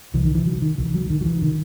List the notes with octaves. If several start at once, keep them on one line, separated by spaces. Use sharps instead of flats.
C2 C3 E3
D#3
E3
F#3
D#3
C#2 C3 E3
F#3
D#3
F#3
E3
C3 D#3